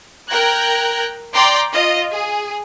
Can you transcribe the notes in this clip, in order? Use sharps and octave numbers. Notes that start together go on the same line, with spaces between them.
A#4 G5 A#5 F#6 G#6 A#6
D5 G5 A#5 C6 D6
F4 D#5
G#4